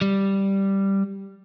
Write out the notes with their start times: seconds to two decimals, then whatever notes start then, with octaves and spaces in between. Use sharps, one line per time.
0.01 G3